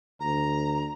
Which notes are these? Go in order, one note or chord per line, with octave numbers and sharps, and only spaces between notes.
D2 A#5